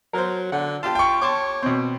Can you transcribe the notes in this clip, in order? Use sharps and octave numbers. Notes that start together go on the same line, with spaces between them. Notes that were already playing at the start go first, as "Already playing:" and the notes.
F#3 A#4 C5
D3 F#5
F4 G4 A5
G5 C#6
C#5 A5 C6 D6
B2 C4